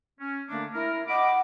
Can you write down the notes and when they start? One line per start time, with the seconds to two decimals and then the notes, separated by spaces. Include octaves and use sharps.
0.20 C#4
0.49 D3 A3 A#3 D4
0.73 E4 A#4
1.08 D#5 F#5 B5 D6